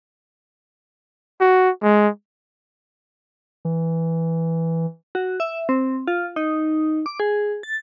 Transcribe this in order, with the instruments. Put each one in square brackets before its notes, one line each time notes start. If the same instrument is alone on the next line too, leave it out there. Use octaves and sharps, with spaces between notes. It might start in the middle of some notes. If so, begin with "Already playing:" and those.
[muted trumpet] F#4
G#3
[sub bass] E3
[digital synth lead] F#4
E5
C4
F4
D#4
D6
G#4
A6